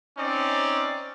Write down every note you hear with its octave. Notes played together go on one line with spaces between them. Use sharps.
C4 C#4 D#4 D5